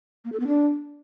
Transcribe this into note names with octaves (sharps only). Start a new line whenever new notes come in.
A#3
A4
B3
D4